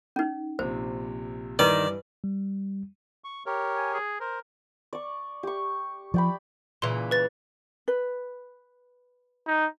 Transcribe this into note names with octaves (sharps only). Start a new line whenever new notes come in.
C#4 D#4
A#1 C3 C5
G2 D#3 E3 B4 D5
G3
C#6
G4 A#4 C#5
G#5
G#4
A#4 C5
D5 C#6
G4 C#6
F3 D5 G5 B5
A#2 C#3 E3 C6
B4 A6
B4
D#4